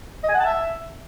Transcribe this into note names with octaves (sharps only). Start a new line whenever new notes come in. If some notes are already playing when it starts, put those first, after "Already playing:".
D#5
G#5
F#5
A5
E5